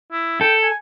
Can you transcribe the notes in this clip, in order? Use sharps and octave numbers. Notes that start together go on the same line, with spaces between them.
E4
A4 G5
G#5